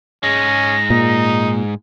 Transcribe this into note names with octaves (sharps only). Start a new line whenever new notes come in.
G#2 G#3 C#4 A#6
A#2 D#4